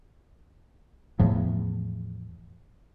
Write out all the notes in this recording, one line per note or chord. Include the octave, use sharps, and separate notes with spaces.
E2 A2 F3